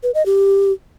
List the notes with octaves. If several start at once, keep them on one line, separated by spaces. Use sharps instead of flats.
B4
D#5
G4